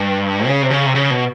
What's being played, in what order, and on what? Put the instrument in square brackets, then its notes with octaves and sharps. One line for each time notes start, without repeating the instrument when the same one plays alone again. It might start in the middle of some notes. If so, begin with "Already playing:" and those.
Already playing: [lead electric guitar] G2
C#3
C3
C#3
C3
C#3
B2